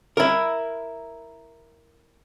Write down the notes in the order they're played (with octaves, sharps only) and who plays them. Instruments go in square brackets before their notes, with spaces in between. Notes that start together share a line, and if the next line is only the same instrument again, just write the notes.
[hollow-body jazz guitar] E4 A#4